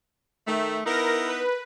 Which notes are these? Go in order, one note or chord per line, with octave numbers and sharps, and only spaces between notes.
D#3 A3
B3 D#4 E4 A#4 A#6
B4